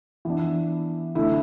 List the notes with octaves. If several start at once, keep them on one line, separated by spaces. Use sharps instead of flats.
E3 B3 D4
D3 A3 E4